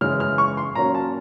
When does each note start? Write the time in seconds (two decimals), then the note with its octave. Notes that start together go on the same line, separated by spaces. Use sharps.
0.01 F#2 C#3 E3 G#3 C#4 F6
0.20 F6
0.38 C#6
0.57 C6
0.75 A#2 F#3 A#3 C#4 A#5
0.95 A5